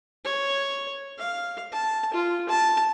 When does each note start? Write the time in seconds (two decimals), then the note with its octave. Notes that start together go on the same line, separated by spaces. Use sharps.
0.25 C#5
1.19 F5
1.72 A5
2.14 F4
2.49 A5